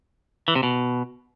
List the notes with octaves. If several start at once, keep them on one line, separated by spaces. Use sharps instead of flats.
E3
C3
B2